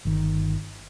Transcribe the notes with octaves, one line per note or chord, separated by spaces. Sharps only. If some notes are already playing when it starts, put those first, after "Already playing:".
G1 D#3